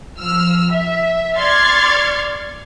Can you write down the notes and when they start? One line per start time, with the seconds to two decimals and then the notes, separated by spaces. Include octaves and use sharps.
0.18 F3 E6 F6
0.71 E5
1.38 D5 C6 C#6 F6 G#6 A6